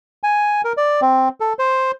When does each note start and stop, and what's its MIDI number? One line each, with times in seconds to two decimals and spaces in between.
0.23 0.61 80
0.65 0.73 70
0.77 1.01 74
1.01 1.29 60
1.40 1.53 69
1.59 1.91 72